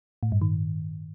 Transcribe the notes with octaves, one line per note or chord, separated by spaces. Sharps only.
A2
G2
D#3